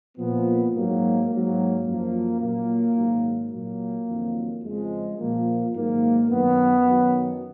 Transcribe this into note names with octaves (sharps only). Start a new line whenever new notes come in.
A#2 F3 B3
G#2 F#3 A#3
G#2 F#3 A#3
F#2 F3 A#3
A#2 F#3 A#3
G#2 D#3 F#3
A#2 F#3 A#3
F2 D#3 F#3
F2 C#3 F3 G#3
A#2 F3 A#3
G#2 D#3 F#3 A#3
F#2 D#3 F#3 B3
F#2 D#3 F#3